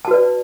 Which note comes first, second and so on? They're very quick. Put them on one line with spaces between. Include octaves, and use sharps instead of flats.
A5 F#4 B4 D5